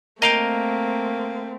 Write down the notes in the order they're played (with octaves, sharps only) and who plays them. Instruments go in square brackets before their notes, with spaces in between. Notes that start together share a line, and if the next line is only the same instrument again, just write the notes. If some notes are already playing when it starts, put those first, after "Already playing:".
[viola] A3 C4 [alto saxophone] A#3 [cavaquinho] A#4 [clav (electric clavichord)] D#5 F5 G5